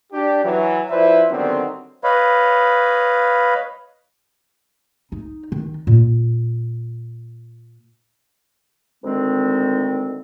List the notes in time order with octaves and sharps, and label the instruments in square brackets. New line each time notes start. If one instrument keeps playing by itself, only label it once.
[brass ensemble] D4 G4
E3 F#3
F3 E4 B4 C5 D5 E5
D3 D#3 F#3 G3 B3 C4
[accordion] B4 C#5 D#5 F5 B5
[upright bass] D#4
D#3
A#2
[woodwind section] D2 D#3 G#3 C4